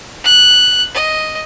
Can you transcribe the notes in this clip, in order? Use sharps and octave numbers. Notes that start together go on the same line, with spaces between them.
F#6
D#5